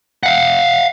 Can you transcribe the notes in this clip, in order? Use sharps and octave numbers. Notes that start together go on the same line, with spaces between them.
F5 F#5